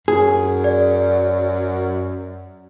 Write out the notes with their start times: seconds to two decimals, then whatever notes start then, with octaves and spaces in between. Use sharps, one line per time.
0.08 F#2 G#4
0.64 D5